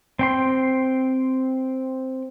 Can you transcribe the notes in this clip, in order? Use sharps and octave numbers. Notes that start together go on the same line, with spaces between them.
C4 G5 C6